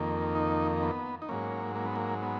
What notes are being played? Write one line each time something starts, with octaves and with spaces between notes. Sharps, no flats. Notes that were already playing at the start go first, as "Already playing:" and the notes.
Already playing: F2 D#3 A#3
D#4
B3
D#4
G#2 F#3 A#3 C#4
A#3
B3
A#3
B3